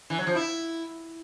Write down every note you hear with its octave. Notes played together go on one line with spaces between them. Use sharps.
E3
F#3
F3
E4